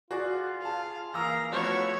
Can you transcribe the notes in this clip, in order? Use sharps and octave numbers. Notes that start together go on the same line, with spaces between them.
F4 F#4 G#4 D5
G#4 F5 A5
E3 A#3 F5 A#5 D#6 E6
F3 A3 B3 E4 F#4 C#5 C#6